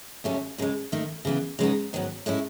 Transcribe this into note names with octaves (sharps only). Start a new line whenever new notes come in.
D#2 C#3 F#3 A3 C#4
D#2 C#3 G#3
D#2 D#3 A3 D#4
C#3 E3 B3
C#3 G#3 B3 D#4
G#2 D#3 F#3 B3
A2 G#3 C#4 E4